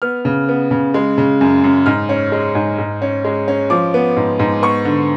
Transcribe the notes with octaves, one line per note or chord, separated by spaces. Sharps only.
B3 F6
C#3
B3
C#3
G#3
C#3
F#2
F#2
G#2 F6
C#4
G#3
G#2
G#2
C#4
G#3
C#4
F3 D6
B3
G#2
G#2
B3 C#6
D3